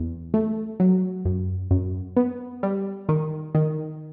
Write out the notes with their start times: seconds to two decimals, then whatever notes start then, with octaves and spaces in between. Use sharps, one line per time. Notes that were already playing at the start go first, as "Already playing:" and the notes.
Already playing: E2
0.34 A3
0.80 F#3
1.25 F#2
1.71 F#2
2.17 B3
2.63 G3
3.09 D#3
3.55 D#3